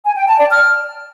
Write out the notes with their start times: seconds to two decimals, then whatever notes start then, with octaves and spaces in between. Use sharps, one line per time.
0.04 G#5
0.16 G5
0.27 A5
0.38 D5
0.50 F6